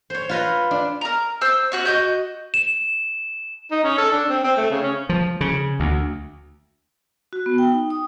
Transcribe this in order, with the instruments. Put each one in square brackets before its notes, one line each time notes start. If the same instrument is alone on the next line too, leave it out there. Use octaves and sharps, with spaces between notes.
[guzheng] C5 C#5
F4 B4 A#5
D4
[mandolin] A#4 A#5
C5 E6
C#4 F#4 F#6
F#4 D#5 G6
[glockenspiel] E7
[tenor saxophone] D#4
C#4
A4
D4
C4
C4
A3
C#3
C#4
[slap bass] F3
C#3
D2
[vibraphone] F#4
B3
G5
D#4
D#6